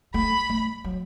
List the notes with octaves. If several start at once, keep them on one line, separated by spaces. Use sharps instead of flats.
A3 B5
A3
F#3